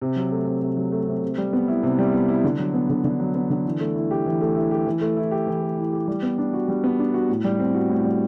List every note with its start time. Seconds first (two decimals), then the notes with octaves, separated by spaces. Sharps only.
0.02 C3
0.16 F#3
0.32 A3
0.47 C3
0.62 C3
0.77 F#3
0.92 A3
1.08 C3
1.23 C3
1.38 G3
1.53 B3
1.68 E4
1.83 C3
1.99 G3
2.13 B3
2.29 E4
2.44 D3
2.59 F#3
2.74 B3
2.89 D3
3.04 D3
3.20 F#3
3.35 B3
3.50 D3
3.65 E3
3.80 A3
3.95 E4
4.11 G4
4.26 E3
4.41 A3
4.56 E4
4.71 G4
4.87 E3
5.01 A3
5.17 E4
5.31 G4
5.47 E3
5.62 A3
5.78 E4
5.92 G4
6.08 G3
6.23 B3
6.38 D4
6.53 F#4
6.68 G3
6.84 B3
6.99 D4
7.14 F#4
7.29 A2
7.44 G3
7.59 C4
7.74 F#4
7.89 A2
8.05 G3